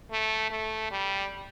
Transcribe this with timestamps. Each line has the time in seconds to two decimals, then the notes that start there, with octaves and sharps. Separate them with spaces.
0.11 A3
0.51 A3
0.91 G3